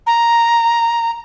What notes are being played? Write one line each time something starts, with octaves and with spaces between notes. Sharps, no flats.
A#5